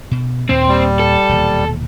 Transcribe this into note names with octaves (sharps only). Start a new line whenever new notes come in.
B2
D#2 A#2 A#3 C4
G3
A4
E1 D#2 A#2